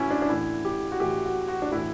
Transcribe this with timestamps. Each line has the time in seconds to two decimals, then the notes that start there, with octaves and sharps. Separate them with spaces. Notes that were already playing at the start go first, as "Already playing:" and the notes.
Already playing: A2 E3 C#4 E4 F#4
0.11 D4
0.22 D4
0.29 A2 E3 E4
0.65 G4
0.92 F#4
1.00 A2 E3 G4
1.25 F#4
1.48 F#4
1.62 D4
1.72 A2 E3 E4